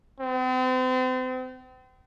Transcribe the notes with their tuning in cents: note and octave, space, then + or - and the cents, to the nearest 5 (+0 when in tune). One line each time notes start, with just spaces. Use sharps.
C4 -40